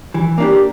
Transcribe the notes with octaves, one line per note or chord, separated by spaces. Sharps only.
E3
A#3 D4 G4